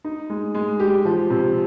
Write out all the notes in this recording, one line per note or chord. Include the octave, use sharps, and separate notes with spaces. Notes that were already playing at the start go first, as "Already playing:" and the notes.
D#4
G#3
G#3
G4
F3
C3